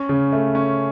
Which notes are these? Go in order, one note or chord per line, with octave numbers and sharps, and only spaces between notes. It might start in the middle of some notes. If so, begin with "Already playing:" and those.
Already playing: C#4
C#3
A3
C#4